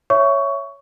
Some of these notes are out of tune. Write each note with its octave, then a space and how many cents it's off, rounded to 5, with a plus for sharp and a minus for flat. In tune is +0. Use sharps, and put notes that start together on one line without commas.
C#5 +0 E5 +10 C#6 +15